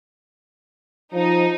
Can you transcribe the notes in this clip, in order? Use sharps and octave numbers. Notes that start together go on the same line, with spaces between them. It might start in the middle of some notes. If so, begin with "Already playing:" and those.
F3 D#4